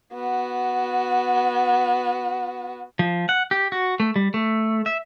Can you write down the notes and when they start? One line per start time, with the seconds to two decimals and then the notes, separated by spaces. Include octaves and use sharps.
0.14 B3 F#4
2.99 F3
3.29 F#5
3.51 G4
3.72 F#4
4.00 A3
4.16 G3
4.34 A3
4.86 E5